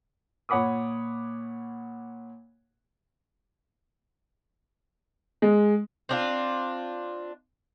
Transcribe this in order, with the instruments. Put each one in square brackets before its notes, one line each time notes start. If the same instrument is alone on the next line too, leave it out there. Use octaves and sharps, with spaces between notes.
[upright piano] A#2 C#5 F#5 B5 D6 D#6
G#3
[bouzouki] C4 D4 F4